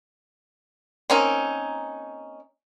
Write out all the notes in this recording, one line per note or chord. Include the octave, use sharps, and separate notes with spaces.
A#3 C4 C#4 D#4